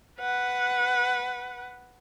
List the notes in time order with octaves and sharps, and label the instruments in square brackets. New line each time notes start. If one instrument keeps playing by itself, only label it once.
[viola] B4 F#5